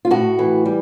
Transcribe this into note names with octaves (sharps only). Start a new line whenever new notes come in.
F4
A2 F#4
E3
G3